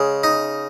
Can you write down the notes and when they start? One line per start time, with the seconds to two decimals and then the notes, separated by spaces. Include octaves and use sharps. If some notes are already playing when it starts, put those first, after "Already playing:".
Already playing: C#3 G#3
0.24 D#4